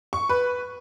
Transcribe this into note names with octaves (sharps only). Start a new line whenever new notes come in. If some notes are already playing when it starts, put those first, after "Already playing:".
C#6
B4